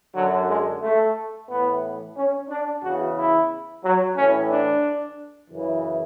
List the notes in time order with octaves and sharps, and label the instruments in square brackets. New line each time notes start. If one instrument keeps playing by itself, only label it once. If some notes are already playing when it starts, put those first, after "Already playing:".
[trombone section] F#2 D3 F#3
G#3
A3
A2 E3 B3
C#4
D4
E2 C#3 E3 F#4
E4
F#3
A2 E3 C#4
D4
F#2 C#3 E3